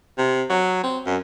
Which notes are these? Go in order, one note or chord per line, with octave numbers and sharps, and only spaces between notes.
C3
F#3
C4
F#2